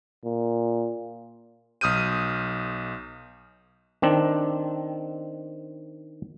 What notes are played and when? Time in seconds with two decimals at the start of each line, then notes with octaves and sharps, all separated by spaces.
0.24 A#2
1.81 B1 D#6 F6 G6 D#7
4.02 D#3 C4 D4